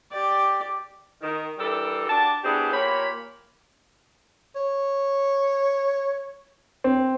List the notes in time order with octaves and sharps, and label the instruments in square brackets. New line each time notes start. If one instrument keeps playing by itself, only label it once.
[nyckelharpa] G4 D5
[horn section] D#3
E3 G3 D4 G4 A4 A#4
D4 F#4 G4 A5
B3 D4 E4 G4 G#4 C5
A#2 A#3 G4 C#5 B5
[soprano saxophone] C#5
[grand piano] C4